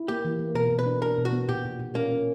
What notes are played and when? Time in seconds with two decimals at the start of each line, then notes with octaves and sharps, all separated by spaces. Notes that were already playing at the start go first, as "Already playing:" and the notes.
Already playing: E4
0.08 A#3 G4
0.25 E3
0.39 A#3
0.55 B2 A#4
0.70 B2
0.79 B4
0.86 D4
1.02 D4 A#4
1.17 B2
1.25 F#4
1.33 B3
1.49 A#2 G4
1.65 A#2
1.79 A#2
1.95 A#3 C#4
2.11 C#4